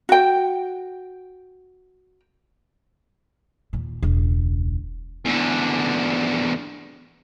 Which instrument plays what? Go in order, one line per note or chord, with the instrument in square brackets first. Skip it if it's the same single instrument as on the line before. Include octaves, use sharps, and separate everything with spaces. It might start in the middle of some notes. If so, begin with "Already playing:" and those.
[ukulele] F#4 G5
[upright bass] D#2 A#2
E1 C#2
[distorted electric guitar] E2 D3